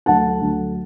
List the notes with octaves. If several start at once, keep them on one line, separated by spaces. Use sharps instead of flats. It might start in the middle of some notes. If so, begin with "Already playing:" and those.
D2 D3 F#3 A3 F#5 A5
D2 D3 F#3 A3